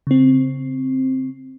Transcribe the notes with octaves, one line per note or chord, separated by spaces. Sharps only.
C#3 C4